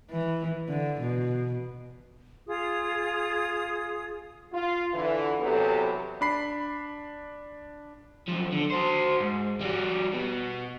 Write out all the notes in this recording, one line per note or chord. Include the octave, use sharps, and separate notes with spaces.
E3
D3
B2
F4 G#4 D#6
F4
D3 E3
E2 C3 F#3 B3 G4 A4
D4 B5 C7
F#2 F3
D3
F#4 C5
G#2
G3 F#4
B2 B3